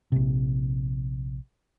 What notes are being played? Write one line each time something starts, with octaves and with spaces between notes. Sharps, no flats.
A#1 C3